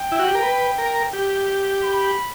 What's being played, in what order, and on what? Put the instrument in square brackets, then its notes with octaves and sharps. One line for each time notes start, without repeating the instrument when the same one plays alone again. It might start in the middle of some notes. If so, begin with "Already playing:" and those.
Already playing: [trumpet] G5
[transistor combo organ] E4
F#4
G4
A#4
B4
A#4
G4
[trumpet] B5